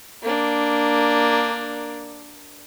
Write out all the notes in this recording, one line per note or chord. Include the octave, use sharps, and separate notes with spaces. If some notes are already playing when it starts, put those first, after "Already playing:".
A#3 D4